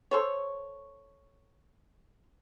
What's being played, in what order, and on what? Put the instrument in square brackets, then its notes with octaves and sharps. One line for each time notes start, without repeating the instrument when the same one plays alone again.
[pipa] A4 C5 C#5